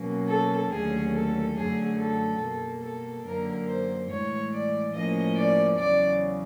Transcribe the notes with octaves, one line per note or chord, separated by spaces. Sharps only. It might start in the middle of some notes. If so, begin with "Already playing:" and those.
Already playing: B2 F#3 A#3 C#4
A4
D#2 D3 F#3 A3 C#4 G#4
A4
F#2 D3 F#3 A3 G#4
A4
B2 G3 A#3
A4
F#2 D3 F#3 A#3 A#4
C5
A2 E3 G#3 C#5
D5
A2 F3 A#3 C#4 D#5
D5
E2 C#3 F#3 D5